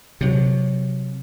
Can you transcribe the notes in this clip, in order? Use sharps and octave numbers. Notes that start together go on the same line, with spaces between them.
C3 F#3